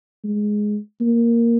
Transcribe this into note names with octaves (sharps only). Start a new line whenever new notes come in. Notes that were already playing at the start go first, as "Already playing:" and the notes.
G#3
A#3